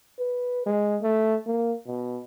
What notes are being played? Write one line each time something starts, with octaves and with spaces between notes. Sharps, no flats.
B4
G#3
A3
A#3
B2